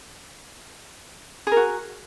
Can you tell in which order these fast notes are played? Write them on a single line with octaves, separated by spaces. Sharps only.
G#4 A#4 F#4